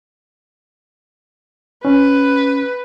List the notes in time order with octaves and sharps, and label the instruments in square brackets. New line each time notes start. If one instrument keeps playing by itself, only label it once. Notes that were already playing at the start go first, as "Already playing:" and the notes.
[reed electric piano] C#4 [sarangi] B4